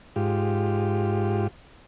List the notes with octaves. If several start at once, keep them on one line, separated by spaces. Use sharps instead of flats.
G#2 F4 G4